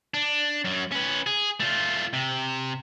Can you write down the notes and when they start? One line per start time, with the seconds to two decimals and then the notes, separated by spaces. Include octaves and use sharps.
0.14 D4
0.65 F#2 F#3
0.92 C#4 B4
1.26 G#4
1.60 A3 F4
2.13 C3